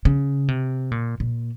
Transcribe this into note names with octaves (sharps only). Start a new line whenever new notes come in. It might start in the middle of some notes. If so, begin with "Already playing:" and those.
C#3
C3
A#2
A#2